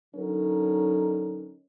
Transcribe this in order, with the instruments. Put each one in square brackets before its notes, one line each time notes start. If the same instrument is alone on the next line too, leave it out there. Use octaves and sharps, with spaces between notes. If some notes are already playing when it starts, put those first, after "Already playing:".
[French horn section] D3 F#3 C#4 D#4 A4 A#4